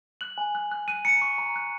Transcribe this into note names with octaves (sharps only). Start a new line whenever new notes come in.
F#6 F#7
G#5
F#6
F#6
F#6 D#7
A#5 C#7
C#6
A#5
F#6